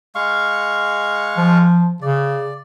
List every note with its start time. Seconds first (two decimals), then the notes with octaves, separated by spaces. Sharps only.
0.15 G#3 F5 C#6
1.37 F3
2.02 C#3 D5